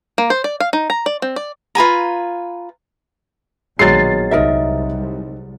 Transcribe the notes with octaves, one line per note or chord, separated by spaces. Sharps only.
A#3
C5
D5
F5
D#4
A#5
D5
C4
D5
F4 B4 G#5 A#5
A#1 B2 D#3 F#3 G#3 A6 C7
C2 D#4 A#4 E5